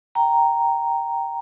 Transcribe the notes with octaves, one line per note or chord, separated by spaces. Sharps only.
G5 A#5